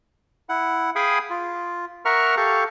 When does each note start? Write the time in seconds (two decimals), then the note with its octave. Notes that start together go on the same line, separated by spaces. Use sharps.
0.49 E4 F#5
0.96 G#4 F5 G5 G#5 B5 D#6
1.30 F4
2.05 A#4 E5 F#5 A#5 C#6 F6
2.37 G4 A4 F5 C#6